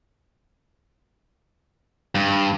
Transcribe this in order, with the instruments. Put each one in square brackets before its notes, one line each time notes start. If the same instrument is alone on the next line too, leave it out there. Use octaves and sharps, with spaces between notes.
[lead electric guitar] G2